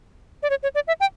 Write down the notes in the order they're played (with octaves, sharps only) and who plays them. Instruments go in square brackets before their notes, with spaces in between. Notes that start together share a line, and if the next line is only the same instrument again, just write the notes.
[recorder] D5
C#5
C#5
D5
E5
G5